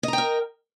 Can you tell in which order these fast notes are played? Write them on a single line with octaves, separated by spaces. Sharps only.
D#5 A#5 G5 A#4